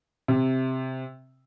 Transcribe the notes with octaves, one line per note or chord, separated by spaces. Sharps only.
C3